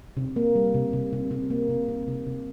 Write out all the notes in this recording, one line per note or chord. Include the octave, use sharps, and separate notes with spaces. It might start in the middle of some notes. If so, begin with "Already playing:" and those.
C3
A#3
G3
C3
C3
C3
C3
A#3
C3
C3
C3
C3